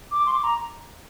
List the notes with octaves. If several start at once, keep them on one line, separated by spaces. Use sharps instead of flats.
D6
C6
D6
A#5